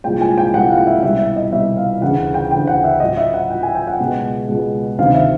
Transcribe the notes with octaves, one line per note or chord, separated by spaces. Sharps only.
C2 A#2 F3 G#3 G5
G#5
G5
C2 A#2 F3 G#3 F#5
F5
E5
C2 B2 G3 E5
E5
D#5
C2 B2 G3 E5
F5
D2 C#3 E3 F#5
G5
D2 C#3 E3 G5
F#5
E5
A2 F#3 D#5
E5
F#5
A2 F#3 G5
G#5
G5
F#5
C#2 B2 G#3
C#2 B2 G#3
D2 C3 D#3 F#3 F5
E5